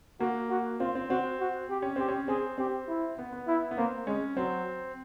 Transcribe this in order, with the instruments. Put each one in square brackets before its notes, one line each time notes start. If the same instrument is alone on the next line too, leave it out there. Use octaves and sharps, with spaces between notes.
[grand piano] A#3 [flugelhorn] F#4
[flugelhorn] F#4
[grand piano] C4 [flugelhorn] F4
[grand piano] C4
[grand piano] C4 [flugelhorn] F#4
[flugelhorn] F#4
G4
[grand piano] C#4
[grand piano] C4 [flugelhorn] G4
[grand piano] C#4
[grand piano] C4 [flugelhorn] G#4
[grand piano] C4 [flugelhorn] G4
[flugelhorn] E4
[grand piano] B3
B3
[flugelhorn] E4
[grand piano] B3
[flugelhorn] A#3 [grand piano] C4
[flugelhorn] G#3 [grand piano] C#4
[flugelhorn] F#3 [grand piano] C4